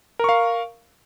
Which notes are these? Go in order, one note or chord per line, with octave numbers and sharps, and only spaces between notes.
A#4 F5 C#6